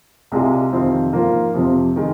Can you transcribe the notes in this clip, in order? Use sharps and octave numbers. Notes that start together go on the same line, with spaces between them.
C2 C3 G#3 F4
F2 C3 D#3 C4 F4
G#2 F3 A#3 F4
F2 C3 F3 C4
D#3 G#3